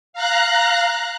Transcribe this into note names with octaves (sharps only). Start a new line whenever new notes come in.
F5 A#5 F#6